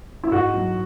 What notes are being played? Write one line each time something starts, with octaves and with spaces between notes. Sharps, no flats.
E4
G#2 F#4
F#3